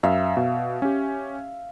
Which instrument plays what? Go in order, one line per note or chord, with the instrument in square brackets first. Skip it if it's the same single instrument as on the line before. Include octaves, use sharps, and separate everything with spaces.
[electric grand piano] F#2 [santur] E5 F5
[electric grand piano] B2
C#4 G4